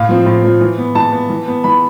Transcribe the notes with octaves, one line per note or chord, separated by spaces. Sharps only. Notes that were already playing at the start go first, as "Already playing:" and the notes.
Already playing: A2 F5
F3 C4
A2
F3 C4
E3
B3
E3 A5
B3
E3
B3
E3 B5